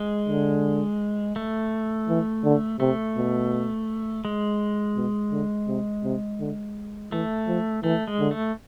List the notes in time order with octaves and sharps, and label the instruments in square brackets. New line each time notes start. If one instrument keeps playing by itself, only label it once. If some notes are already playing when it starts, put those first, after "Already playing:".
Already playing: [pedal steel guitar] G#3
[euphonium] D3
[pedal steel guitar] A3
[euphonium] E3
D3
[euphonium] C3 [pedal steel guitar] A3
[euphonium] B2
[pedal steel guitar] G#3
[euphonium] B2
D3
C3
C3
D3
[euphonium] E3 [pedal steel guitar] A3
[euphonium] F3
[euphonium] E3 [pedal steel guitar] A3
[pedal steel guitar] G#3
[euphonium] D3
[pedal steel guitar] A3